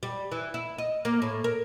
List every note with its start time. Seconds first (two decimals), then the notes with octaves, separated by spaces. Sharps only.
0.03 G3
0.32 E3
0.54 E4
0.78 D#5
1.05 A#3
1.22 A2
1.44 A#4